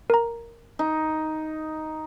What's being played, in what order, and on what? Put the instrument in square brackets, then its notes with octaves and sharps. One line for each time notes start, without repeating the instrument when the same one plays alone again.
[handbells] A#4 A#5
[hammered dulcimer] D#4